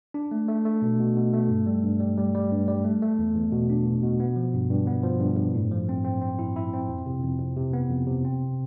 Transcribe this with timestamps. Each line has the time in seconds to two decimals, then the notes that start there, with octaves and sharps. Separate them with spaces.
0.14 D4
0.31 A3
0.48 A3
0.65 A3
0.82 B2
1.00 B2
1.16 B2
1.33 A3
1.50 G2
1.66 G3
1.83 G2
2.00 G3
2.18 G3
2.34 G3
2.52 G2
2.68 G3
2.84 A3
3.02 A3
3.19 E2
3.35 E2
3.52 B2
3.70 D4
3.86 B2
4.03 B2
4.20 B3
4.36 F3
4.54 G2
4.70 G2
4.87 B3
5.03 F3
5.20 G2
5.37 G2
5.55 A2
5.71 F3
5.89 C4
6.05 C4
6.21 C4
6.39 E4
6.56 E4
6.73 C4
6.89 F2
7.06 C3
7.23 F2
7.40 F2
7.57 C3
7.73 B3
7.90 F2
8.07 C3
8.25 C4